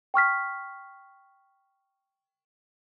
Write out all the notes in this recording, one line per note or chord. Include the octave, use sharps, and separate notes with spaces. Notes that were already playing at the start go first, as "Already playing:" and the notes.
G5 C#6 F6 B6